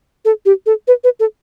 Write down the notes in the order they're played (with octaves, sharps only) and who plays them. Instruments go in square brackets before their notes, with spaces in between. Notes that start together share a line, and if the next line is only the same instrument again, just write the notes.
[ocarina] A4
G4
A4
B4
B4
A4